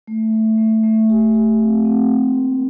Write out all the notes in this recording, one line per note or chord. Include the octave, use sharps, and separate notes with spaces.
A3
A3
A3
A3
G4
G4
C4
C4
A#3
A#4